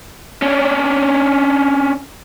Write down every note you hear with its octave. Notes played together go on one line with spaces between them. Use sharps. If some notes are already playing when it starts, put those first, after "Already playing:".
C#4 D4